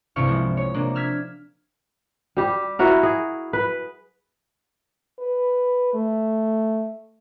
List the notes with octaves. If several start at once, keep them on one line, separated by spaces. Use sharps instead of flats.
C2 G2 C3 E4 C#6 F6
F3 G#3
C#5
C3 A#3 D4
E6 F6 G#6 B6
G3 G4
E4 F#4 A#4
G#4
B4
B4
A3